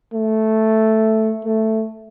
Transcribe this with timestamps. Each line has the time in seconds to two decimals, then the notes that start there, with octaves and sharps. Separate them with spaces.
0.14 A3
1.44 A3